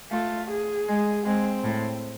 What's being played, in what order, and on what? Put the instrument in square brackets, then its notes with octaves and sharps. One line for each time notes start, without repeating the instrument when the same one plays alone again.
[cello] A3 [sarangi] F4
[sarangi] G#4
[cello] G#3
[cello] G#3 [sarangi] C4
[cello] A2